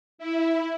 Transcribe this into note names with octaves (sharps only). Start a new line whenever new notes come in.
E4